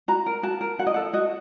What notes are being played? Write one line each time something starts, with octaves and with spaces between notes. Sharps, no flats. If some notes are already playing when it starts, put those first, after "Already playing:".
F#4 A#5
A#4
F#4 A5
A#4
F#4 F#5
D#5
A4 F#5
F#4 D#5